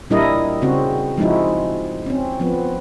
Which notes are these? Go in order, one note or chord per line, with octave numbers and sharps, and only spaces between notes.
A#2 G3 D4 E4 A#4 D#5
C#3 C4 F#4
F3 G#3 D#4 E4 F#4
C4 C#4
F3 B3 C4